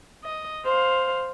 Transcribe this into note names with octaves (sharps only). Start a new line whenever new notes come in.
D#5
C5 F5